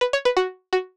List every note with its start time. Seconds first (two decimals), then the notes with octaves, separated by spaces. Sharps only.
0.01 B4
0.13 C#5
0.25 B4
0.37 F#4
0.73 F#4